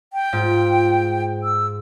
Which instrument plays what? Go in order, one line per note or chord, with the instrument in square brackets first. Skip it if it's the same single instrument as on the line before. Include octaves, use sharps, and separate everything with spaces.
[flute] G5
[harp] G#2 F4
[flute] E6